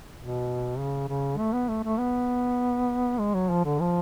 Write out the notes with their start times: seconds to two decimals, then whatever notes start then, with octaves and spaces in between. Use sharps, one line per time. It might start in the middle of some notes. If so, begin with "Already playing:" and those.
0.17 B2
0.78 C#3
1.08 C#3
1.38 A3
1.53 B3
1.68 A3
1.84 A3
1.98 B3
3.18 G#3
3.34 F#3
3.50 F3
3.64 D3
3.80 F3